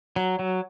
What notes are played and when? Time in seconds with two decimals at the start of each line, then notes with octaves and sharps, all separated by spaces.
0.16 F#3
0.39 F#3